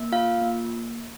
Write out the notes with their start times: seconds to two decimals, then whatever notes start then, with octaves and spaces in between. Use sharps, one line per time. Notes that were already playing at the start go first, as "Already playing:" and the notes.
Already playing: A#3
0.12 F4 F5
0.42 A#3